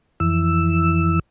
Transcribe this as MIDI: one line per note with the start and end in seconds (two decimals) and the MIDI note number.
0.20 1.19 41
0.20 1.19 52
0.20 1.19 88